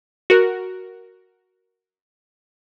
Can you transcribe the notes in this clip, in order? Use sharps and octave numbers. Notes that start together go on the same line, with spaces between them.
F#4 A#4